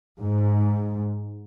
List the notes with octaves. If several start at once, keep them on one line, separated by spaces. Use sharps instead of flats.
G#2